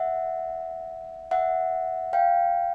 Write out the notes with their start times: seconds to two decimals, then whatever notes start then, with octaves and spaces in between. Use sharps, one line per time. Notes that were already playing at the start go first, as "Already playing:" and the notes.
Already playing: E5 F#5
1.31 E5 F#5
2.13 F5 G5